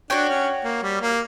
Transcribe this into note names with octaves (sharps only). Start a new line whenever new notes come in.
D4 F#4 C#5 G5
C#4
A#3
G3
A#3